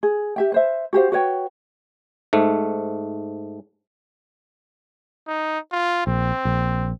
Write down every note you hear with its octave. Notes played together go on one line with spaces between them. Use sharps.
G#4
G4 E5 G5
B4 C5 E5
F#4 G4 C5 F5
F#4 B4 C#5 G5
G#2 A3
D#4
F4
A#1 C4
A#1